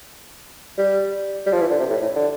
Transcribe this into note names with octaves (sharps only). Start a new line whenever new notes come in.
G3
G3
F3
E3
D3
C3
A2
A2
D3